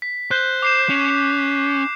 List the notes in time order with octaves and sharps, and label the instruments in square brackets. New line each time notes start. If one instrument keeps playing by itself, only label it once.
[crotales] B6
[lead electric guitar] C5 [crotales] F#6 G6
[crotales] D6 C7 E7
[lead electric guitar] C#4